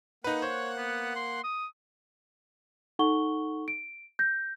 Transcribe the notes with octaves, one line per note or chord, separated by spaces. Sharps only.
A#3 D#4 B4 F#5 F#6
C5 C#5
B3
C6
D#6
D#4 A4 F#5 C#6 G7
D7
G6 A#6